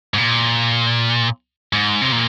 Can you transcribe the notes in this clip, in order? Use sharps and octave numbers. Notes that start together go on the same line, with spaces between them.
G#2
A#2
G#2
C3
A#2